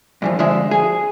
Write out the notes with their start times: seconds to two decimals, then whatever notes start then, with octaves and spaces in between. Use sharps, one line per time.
0.22 G2 E3 F3
0.39 F2 D3 G#3 F4 E5
0.71 G#4